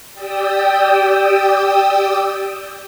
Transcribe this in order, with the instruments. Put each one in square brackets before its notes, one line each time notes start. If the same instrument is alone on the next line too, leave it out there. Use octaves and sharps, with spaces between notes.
[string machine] G4 D5 G5 D#6 E6